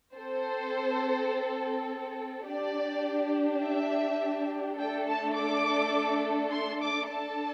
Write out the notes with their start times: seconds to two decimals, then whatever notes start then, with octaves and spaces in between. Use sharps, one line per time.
0.15 C4 A4 C5
2.47 D4 G4 D5
3.63 E5
4.78 A3 D4 A4 G5
5.07 A5
5.36 D6
6.52 C6
6.81 D6
7.10 D4 A4 A5